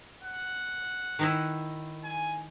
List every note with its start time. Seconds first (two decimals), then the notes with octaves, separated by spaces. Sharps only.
0.23 F#5
1.19 D#3 D#4 E4
2.04 G#5